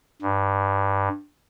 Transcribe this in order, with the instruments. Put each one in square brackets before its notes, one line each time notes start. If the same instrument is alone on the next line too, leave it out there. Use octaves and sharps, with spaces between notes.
[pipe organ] G2